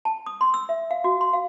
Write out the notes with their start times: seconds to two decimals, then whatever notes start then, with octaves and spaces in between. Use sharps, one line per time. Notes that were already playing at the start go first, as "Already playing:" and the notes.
0.05 A5
0.26 D#6
0.41 C6
0.54 E6
0.69 E5
0.91 F5
1.04 F#4
1.21 C6
1.33 F5